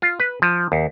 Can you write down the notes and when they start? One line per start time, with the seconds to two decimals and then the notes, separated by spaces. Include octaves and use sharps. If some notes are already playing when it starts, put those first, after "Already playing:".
0.02 F4
0.20 B4
0.42 F3
0.72 D#2